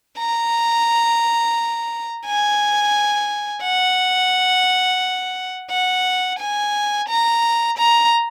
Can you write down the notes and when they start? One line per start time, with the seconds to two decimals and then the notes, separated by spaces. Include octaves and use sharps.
0.18 A#5
2.26 G#5
3.63 F#5
5.71 F#5
6.39 G#5
7.09 A#5
7.78 A#5